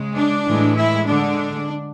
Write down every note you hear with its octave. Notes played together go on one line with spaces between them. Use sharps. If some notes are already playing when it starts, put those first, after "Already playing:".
Already playing: C#3 G#3
D4
A2 E3 G#3
E4
D3 G#3 D4